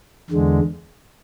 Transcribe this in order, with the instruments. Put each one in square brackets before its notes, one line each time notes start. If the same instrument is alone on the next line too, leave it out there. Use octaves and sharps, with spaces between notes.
[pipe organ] E2 D3 G#3